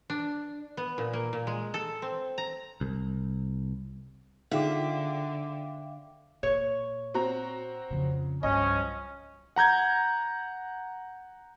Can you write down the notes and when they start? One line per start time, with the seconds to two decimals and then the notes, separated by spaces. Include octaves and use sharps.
0.10 D4
0.77 B3
0.98 A#2
1.13 A#3
1.33 A#2
1.47 G#3
1.74 A4
2.02 C4
2.38 A#5
2.81 C2
4.51 D3 D#4 F4 G#4 E5 F5 G5 D6
6.43 A#2 C#5
7.14 C4 F#4 A#5
7.91 F2 C#3
8.43 C2 G2 F3 F#3 C#4 D#5
9.56 F#5 A#5 G6 G#6